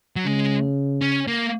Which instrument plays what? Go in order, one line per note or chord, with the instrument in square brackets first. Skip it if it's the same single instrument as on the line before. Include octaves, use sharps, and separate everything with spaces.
[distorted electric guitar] F#3
[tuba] C#3 [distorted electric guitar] G#3
[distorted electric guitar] C#4
A#3